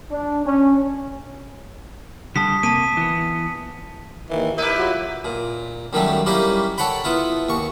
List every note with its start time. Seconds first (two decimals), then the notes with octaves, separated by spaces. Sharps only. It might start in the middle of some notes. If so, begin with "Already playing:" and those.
0.11 D4
0.46 C#4
2.36 D3 G3 A5 D#6 B6
2.63 C3 A#3 A5 B6 D#7
2.97 E3 B3
4.30 D#2 D#3 E3
4.58 E4 G4 A#4 B4
4.77 F#3 F4 F#4
5.25 A#2
5.93 F#2 D#3 F#3 G3 A3
6.26 G3 A#3 C#4 D#4 E4
6.78 A4 C#5 F#5 G5 B5
7.04 B3 E4 F4
7.49 D#2 C#6